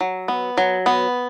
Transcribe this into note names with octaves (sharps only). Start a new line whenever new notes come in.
F#3
B3
F#3
B3